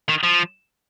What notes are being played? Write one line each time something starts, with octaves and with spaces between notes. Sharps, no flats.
D#3
F3